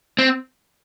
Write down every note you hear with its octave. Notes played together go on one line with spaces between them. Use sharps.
C4